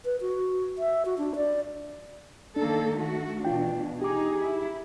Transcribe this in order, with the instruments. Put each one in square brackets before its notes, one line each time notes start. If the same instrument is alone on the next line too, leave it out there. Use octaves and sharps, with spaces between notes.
[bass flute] B4
F#4
E5
F#4
D4
D5
[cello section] D#3 A#3 A4 [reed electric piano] D4
[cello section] A3 F#4
[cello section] B2 E3 D4 [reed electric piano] F4 G5
[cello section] D#4 G#4 [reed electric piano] G4 D6
[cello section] E4